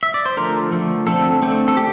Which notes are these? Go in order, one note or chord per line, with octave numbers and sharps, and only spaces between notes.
E5
D5
C5
D3 F3 A3 A#4
D3 F3 A3
D3 A3 C4 A4
D3 A3 C4
A4
D3 G4